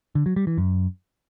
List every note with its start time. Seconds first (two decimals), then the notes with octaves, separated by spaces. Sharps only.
0.15 D3
0.26 F#3
0.36 G3
0.47 E3
0.58 F#2